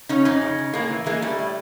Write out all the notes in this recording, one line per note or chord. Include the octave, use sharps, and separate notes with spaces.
C#3 C#4 D#4
F2 C#4 D#4
C#3
C#3
A2 G#3 A#3
E3
E3 G#3 A#3
E3 G3 A3
A2